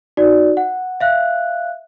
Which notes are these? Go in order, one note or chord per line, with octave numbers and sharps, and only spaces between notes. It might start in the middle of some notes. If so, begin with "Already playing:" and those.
D#4 F#4 D5
F#5
E5 F5 F#6